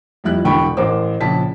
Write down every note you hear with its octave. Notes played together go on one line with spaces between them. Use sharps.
F2 G3 E4 F#6
E1 D3 E3 G5 B5 C#6
A1 A#4 C5 D6
A#1 C#3 A5 B6